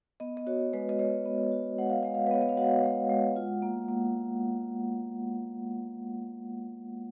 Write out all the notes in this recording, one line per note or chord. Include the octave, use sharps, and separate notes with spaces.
B3 D#5
D#5
F#4 C#5
G#3 B4
D#5
G#3 C#5
B3
F#4
G#3 F#5
F5
G#3 D#5
F5
B4
B3 C#5
D#5
F5
F#4 F#5
G#3
G#3
F4
A#3
A#3